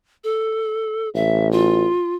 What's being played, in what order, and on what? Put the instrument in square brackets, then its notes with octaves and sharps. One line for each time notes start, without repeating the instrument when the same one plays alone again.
[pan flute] A4
[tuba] A1 [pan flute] E5
[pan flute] F4